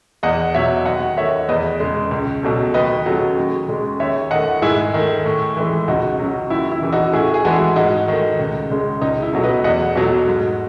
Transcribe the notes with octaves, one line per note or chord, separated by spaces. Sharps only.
E2 D#5 F#5
B2 F#3 C#5 E5
D#2 D#5 F#5
D#3 A3 C#5 E5
E2 B4 D#5
C#3 G#3
C#2
B2 F#3 A3
D#2 B4 D#5
C#3 F#3 A3
D#2
C#3 G#3
D#2 C#5 E5
D#3 A3 D#5 F#5
G#2 E4 G#4
D#3 A3
A2
E3 G#3
C#2 D#4 F#4
C#3 F#3
D#2 E4
E4
C#3 E3
D#4 F#4
A2 E4 G#4
G#4
E3 G#3 F#4 A4
G#2 D#4 F#4
D#3 A3
C#2
C#3 G#3
C#2 D#4
E4
B2 F#3 A3
B4 D#5
E2 D#5 F#5
B2 F#3 A3
G#2